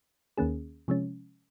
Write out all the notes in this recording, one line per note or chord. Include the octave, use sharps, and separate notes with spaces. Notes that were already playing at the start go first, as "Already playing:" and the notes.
D#2 D#3 A#3 C#4 G#4
C3 F3 G#3 C#4